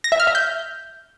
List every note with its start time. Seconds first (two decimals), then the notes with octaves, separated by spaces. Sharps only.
0.04 A#6
0.12 E5
0.20 F6
0.27 E5
0.35 G6